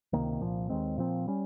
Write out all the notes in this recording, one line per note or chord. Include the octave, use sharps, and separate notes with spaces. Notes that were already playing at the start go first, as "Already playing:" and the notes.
C#2 C3 D#3 A#3
C2 A#2 F3
D#2 D#3 G#3 C4
A#2 F3 C4
G3 C#4